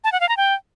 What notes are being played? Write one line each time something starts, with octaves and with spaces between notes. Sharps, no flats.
A5
F#5
F5
A#5
G5